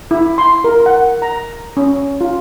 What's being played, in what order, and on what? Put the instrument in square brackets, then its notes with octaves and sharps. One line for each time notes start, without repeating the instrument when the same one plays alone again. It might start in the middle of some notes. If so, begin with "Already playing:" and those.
[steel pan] E4
C6
A#4
F#5
A#5
C#4
F4